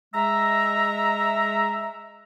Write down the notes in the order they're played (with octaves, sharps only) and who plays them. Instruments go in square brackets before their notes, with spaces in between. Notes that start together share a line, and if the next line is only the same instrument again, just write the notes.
[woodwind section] G#3 E5 A#5